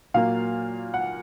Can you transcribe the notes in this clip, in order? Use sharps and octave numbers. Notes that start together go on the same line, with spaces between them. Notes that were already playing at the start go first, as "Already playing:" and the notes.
A#2 F#3 A#3 F5
F#5